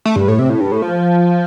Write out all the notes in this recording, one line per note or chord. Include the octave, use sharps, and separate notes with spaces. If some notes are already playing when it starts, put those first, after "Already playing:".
A3
G2
A2
C3
A2
G2
A2
F3